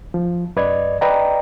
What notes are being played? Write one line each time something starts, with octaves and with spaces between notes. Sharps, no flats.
F3
F#2 B4 D5 D#5 G#6
B4 D5 D#5 G5 A#5